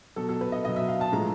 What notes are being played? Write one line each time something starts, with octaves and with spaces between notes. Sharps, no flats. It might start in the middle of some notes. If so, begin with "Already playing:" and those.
B2 F#3 A4
A4
B4
D#5
B2 F#3 D#5
E5
F5
A5
A2 F3 G#3 A#5